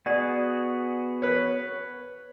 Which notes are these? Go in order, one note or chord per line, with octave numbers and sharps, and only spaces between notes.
B3 F#4 G#4 D5
B4 C#5